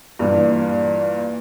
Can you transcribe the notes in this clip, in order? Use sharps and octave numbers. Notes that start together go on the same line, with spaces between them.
G2 A#2 E3